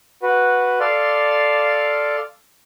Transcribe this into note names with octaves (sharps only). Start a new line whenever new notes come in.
F#4 B4
A4 D5 F5 C6